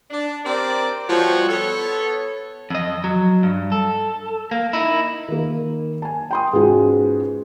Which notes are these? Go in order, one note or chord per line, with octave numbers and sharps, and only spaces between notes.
D4
C4 G4 A#4 D5
F3 G3 B3 F#4 C5 C#5
B3 A4 C#5
F2 D#5
F#3
G2
A4
A#3
D#4 E4
D#3 A#3
G#5 A5
G5 C6 D#6
G#2 B3 C#4 F4 F#4